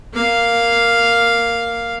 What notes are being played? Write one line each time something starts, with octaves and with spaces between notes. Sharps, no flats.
A#3 F5